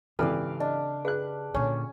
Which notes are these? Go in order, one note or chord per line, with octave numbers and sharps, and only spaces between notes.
G#1 C#3 E3 G4 A4 D5 F5 F6
D4 D#5
G#4 B4 F#5 F#6
A#2 D3 C#4 C#5